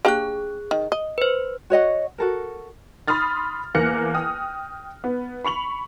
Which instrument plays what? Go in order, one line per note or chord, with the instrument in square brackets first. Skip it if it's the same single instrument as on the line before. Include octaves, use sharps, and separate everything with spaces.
[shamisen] A#3 D4 G4 [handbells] G#4 F#6
[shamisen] D#3
D#5
[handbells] B4 C5
[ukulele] F#4 C#5 D#5 F#5
F#4 A4 A#4
[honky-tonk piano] B5 C6 D#6 F6 A6
E2 A#3 F6 F#6 A#6 C#7
G5 D#6 F6
B3
B5 C#6 F7 F#7